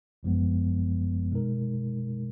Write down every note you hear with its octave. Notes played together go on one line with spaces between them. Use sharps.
G#1 F#2 F3 G#3 B3
B2 G#3 D#4 A#4